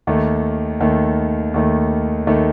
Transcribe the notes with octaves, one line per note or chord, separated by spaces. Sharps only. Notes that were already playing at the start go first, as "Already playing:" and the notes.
D#2 D#3 A3
D#2 D#3 A3
D#2 D#3 A3
D#2 D#3 A3